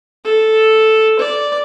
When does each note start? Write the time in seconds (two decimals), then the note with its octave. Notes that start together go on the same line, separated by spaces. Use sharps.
0.25 A4
1.19 D5